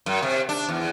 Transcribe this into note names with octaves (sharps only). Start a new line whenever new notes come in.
F#2
C3
D4
E2